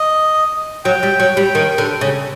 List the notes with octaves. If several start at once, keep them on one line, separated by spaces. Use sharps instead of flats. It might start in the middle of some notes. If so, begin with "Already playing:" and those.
Already playing: D#5
F#3 G5
G3
F#3
G3
D#3
D3
C#3